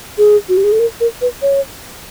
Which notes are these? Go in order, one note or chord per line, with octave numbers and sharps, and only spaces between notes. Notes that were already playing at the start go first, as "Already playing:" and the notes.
G#4
F#4
G4
G#4
A4
A#4
A#4
B4
C#5